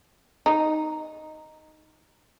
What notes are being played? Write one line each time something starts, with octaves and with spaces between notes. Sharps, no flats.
D#4